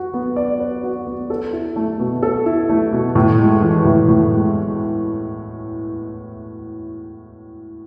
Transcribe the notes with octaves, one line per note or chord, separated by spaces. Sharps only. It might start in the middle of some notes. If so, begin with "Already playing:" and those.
Already playing: F#4 B4
B3
D5
B4
F#4
B3
A4
E4
A3
B2
A4
E4
A3
B2
A2
G#3
E3
A2
A2
G#3